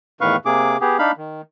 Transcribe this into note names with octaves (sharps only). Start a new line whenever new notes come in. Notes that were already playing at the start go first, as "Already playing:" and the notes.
E2 A2 D#3 B4 F5 C#6
C3 A#3 G#4 D6
B3 G4 G#4
D4 D#4 F5 B5
D#3